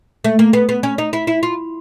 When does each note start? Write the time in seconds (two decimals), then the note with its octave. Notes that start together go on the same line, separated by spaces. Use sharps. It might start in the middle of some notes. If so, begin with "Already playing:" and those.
0.24 A3
0.39 A#3
0.53 B3
0.69 B3
0.83 C#4
0.98 D#4
1.13 E4
1.27 E4
1.43 F4